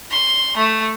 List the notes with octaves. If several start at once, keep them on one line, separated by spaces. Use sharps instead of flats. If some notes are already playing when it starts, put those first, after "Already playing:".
C6
A3